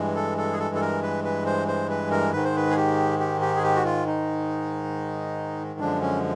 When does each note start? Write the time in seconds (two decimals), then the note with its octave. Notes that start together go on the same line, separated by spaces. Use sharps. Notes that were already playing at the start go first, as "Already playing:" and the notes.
Already playing: G2 E3 G#3
0.16 A4
0.38 A4
0.53 G#4
0.59 A4
0.75 A4
0.81 A#4
1.03 B4
1.24 B4
1.46 C5
1.68 C5
1.90 B4
2.11 A#4
2.32 G#2 D#3 G#3 B4
2.45 C5
2.56 B4
2.71 G#4
2.76 G4
3.20 G4
3.41 G4
3.56 G#4
3.63 G4
3.76 F#4
3.85 F4
4.07 D#4
5.80 F#2 D3 F3 G#3 D4
6.02 C#4